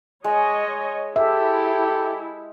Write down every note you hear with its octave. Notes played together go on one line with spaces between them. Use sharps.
G#3 C#5 D#5
E4 G4 A4 E5